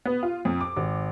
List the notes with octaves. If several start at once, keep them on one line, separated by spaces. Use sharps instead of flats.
B3
F4
F2
D6
G#1